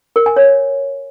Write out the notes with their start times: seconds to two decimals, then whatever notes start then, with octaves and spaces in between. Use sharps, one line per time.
0.16 A#4
0.26 G#5
0.36 C#5